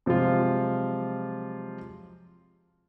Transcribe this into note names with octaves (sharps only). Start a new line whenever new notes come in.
C3 F3 F#3 G#3 F4